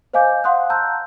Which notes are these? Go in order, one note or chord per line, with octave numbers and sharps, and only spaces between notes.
C5 D#5 F5 G#5 D6 G6
F5 F#5 C6 D#6 F#6
A5 A#5 E6 G6